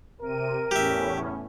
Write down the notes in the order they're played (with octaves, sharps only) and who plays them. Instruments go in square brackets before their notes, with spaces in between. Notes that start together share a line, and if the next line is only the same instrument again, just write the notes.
[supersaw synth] C3 D#7 [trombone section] A#4
[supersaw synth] E2 A2 C#4 [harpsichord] G4 E5